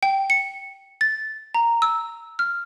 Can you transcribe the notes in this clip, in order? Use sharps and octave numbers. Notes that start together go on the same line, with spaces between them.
G5
C#7
A6
A#5
E6
F6